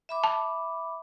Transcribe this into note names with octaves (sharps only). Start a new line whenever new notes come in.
E5 B5 D6
A5